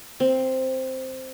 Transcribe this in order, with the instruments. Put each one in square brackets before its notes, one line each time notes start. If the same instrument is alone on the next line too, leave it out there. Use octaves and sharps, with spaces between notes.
[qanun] C4